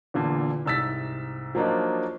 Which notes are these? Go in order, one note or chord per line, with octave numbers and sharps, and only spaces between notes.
E2 A#2 D3
C2 G#2 E6 A6 B6
F3 F#3 A#3 D4 D#4 F4